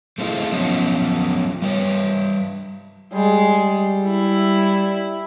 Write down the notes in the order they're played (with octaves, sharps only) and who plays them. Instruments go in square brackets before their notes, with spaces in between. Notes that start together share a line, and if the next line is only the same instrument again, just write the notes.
[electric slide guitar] G#3 A3 C4 D4 E4 F4
F3 F#3 B3 C#4 F#4
G3 B4 C#5
[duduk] G3 [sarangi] G#3
[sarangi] E4